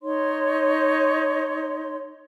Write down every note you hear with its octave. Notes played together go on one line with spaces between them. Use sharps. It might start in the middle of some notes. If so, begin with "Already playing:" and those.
D#4 C#5 C6